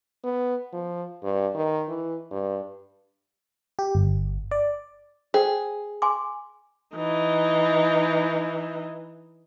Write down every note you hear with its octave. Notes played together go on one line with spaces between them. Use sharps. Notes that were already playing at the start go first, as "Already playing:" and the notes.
B3
F3
G2
D#3
E3
G2
G4
G1
D5
G#4 C5 G5
G#5 C6 D6
E3 D#4